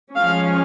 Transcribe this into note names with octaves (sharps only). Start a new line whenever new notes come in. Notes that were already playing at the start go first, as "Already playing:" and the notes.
F3 G#3 C#4 F5